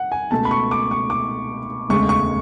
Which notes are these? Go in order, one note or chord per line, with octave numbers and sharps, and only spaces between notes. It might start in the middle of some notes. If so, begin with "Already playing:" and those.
Already playing: F#5
G#5
C#2 B2 A3 A5
B5
C#6
D6
C#6
D6
E1 D2 C#3 G#3 C#6
C#6